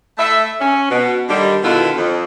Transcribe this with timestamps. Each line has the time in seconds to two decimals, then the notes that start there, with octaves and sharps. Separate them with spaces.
0.18 A3 E5
0.59 C#4
0.88 B2
1.28 D3 D#3 G3
1.63 B2 D3 D#3 E4 F4 B4
1.96 F2